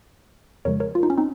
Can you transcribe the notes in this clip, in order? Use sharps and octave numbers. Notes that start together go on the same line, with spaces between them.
F2 C#3 F3 G#3 A#4 C#5
A#4 C#5
F4
D#4
C#4
C4 D#4